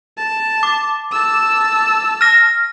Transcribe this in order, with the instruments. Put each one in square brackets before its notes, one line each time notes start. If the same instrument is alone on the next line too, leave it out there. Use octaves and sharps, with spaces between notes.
[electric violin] A5
[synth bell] D6
[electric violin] A5 E6
[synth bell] F6 A#6